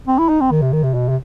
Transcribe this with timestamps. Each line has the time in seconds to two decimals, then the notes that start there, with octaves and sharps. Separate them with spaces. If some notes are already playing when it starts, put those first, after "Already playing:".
0.08 C4
0.19 E4
0.29 D#4
0.40 C4
0.51 D#3
0.62 C3
0.73 D#3
0.83 C3
0.94 B2
1.09 C3